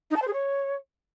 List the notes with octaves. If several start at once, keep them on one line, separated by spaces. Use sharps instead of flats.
D#4
A5
C5
G#4
C#5